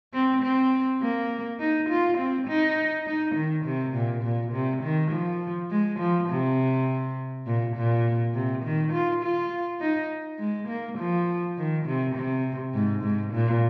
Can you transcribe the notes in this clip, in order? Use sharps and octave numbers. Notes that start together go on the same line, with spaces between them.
C4
C4
A#3
D#4
F4
C4
D#4
D#4
D#3
C3
A#2
A#2
C3
D#3
F3
G#3
F3
C3
A#2
A#2
C3
D#3
F4
F4
D#4
G#3
A#3
F3
D#3
C3
C3
G#2
G#2
A#2